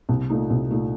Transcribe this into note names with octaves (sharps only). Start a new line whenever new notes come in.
C2
A#2 A3 D#4
C2
A#2 A3 D#4